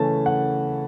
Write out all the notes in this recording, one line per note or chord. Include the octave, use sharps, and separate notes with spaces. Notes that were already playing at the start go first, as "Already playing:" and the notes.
Already playing: C#3 E3 A3 C#4 A5
F#5